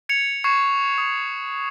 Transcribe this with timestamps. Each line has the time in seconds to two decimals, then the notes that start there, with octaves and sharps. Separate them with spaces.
0.09 G#6 C#7 F7
0.44 C#6 F#6 G#6 C7 C#7 E7
0.98 D#6